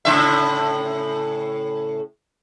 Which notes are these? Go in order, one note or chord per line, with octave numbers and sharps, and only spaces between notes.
A2 C#3 E5